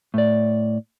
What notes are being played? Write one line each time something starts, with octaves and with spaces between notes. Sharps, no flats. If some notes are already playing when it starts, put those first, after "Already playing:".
A2 D5